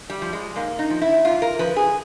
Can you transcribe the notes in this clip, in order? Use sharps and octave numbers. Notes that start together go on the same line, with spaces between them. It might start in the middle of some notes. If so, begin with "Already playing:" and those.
G3
F3
G#3
G#2 A#3
D#4
F3
E4
G#2 F4
A#4
F3 B4
G#4